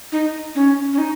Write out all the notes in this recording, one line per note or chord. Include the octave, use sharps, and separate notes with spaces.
D#4
C#4
C#4
D#4